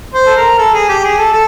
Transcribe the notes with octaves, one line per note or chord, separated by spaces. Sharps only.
C5
A4
A#4
A4
G#4
G4
G#4
A4
A4